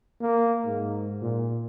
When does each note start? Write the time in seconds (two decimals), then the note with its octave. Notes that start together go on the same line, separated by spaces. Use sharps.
0.21 A#3
0.65 G#2
1.22 A#2